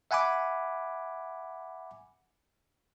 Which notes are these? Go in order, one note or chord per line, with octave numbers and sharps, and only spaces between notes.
E5 F#5 G#5 B5 D6